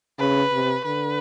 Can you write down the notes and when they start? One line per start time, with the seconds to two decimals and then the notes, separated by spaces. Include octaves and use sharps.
0.19 C#3 B4
0.52 C3
0.85 D3 B4